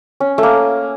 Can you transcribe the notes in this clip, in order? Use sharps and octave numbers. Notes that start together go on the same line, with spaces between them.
C#4
A3
A#3